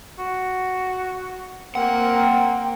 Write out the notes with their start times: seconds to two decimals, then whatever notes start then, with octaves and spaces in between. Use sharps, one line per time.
0.19 F#4
1.75 A#3 C4 F#5 G5